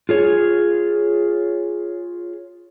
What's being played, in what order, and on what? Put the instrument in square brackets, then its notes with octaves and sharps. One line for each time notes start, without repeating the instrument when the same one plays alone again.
[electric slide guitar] F4 G#4 C#5